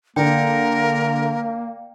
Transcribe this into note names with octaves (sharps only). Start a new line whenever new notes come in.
D3 A#3 A#4 D5 G5